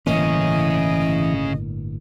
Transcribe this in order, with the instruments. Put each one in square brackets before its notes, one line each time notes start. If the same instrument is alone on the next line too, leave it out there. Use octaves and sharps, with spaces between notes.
[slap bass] G1 A2 A#3 [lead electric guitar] C#3 C#4 [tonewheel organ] E3 [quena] D#5